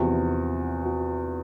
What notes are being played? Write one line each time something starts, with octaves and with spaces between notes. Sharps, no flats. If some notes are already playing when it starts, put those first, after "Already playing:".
Already playing: E2 C3 F3 F#4
F#4